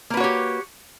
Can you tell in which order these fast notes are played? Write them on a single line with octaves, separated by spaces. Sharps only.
A#3 B4 F#4 C#5 G4